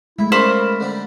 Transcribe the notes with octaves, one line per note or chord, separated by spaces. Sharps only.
G#3 A3 E4 E5
C#3 G3 C#4 A#4 C5 B5 D6
D3 G3 G4